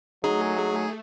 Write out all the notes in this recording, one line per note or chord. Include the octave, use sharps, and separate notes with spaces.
F#3 A3 D#4 G#4